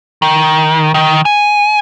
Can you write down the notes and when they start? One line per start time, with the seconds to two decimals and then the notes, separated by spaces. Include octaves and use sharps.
0.22 D#3
0.94 D#3
1.25 G#5